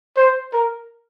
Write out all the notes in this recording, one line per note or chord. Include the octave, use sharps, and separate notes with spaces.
C5
A#4